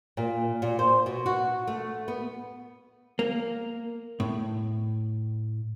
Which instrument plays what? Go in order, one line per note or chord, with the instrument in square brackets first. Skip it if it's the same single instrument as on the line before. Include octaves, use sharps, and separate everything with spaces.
[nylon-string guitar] A#2
A#2
C5
B2
F#4
A3
B3
[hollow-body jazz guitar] A#3
A2